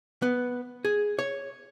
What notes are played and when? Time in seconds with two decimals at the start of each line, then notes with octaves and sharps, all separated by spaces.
0.22 B3
0.85 G#4
1.19 C#5